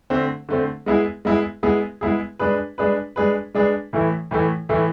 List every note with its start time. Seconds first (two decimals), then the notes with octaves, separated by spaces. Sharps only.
0.10 D3 A3 C4
0.49 D3 A3 C4
0.86 G#3 B3 E4 G#4
1.25 G#3 B3 E4 G#4
1.63 G#3 B3 E4 G#4
2.01 G#3 B3 E4 G#4
2.39 G#3 D4 G#4 B4
2.78 G#3 D4 G#4 B4
3.16 G#3 D4 G#4 B4
3.54 G#3 D4 G#4 B4
3.93 A2 E3 A3 E4
4.31 A2 E3 A3 E4
4.69 A2 E3 A3 E4